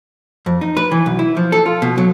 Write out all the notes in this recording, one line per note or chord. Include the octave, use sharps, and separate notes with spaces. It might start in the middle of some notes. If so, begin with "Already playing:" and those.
F2
D#4
B4
E3
B1
E4
F3
A4
F4
B2
F#3